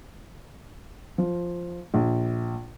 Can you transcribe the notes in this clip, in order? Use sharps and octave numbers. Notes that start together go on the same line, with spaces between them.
F3
A#1